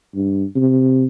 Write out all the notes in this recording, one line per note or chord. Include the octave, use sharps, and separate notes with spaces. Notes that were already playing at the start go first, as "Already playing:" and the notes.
G2
C3